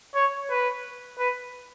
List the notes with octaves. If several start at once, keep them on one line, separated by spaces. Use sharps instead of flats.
C#5
B4
B4